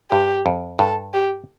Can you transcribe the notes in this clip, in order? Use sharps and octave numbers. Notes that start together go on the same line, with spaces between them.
G2 G4
F2
G2 A4
G4